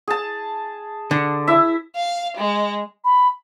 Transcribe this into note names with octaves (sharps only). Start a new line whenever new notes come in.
G#4 A5
D3
E4 E5
F5
G#3
B5